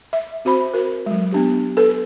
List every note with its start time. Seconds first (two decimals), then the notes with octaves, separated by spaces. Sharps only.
0.13 E5
0.45 C4 F#4 C5 B5
0.74 F#4 A#4
1.06 F#3 G#3
1.32 B3 D4 G4
1.77 A4 B4